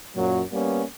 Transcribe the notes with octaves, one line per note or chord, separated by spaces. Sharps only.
F#2 A#2 F#3
G3 A#3 B3 C#4